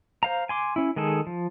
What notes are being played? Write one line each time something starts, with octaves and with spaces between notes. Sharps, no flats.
C5 F5 A#5
G#5 C6 D6
C#4 E4
D#3 G#3 G#4 A4
F3